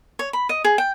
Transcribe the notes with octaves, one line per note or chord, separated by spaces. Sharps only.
C#5
B5
D#5
G#4
G5